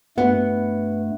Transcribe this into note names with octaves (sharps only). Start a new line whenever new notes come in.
G2 A3 B3 F#5